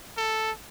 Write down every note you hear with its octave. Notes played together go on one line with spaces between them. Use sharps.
A4